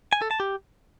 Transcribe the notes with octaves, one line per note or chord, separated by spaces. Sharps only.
G#5
A4
A5
G4